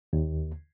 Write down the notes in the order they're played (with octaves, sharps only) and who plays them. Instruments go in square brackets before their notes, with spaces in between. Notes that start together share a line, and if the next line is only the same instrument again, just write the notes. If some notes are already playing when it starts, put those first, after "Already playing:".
[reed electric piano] D#2